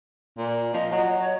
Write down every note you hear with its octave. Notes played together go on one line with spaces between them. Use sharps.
A#2
F3 D#5
F#3 D#5
C#5